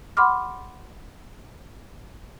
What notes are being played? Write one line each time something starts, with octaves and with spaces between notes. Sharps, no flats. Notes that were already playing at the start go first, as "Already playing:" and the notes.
F#5 B5 C6 D6 F6